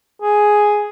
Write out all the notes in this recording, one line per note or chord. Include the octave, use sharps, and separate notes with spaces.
G#4